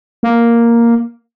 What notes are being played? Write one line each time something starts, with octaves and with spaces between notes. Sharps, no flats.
A#3